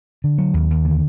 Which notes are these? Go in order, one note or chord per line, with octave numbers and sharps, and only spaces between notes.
D3
F#3
D#2
D#2
D3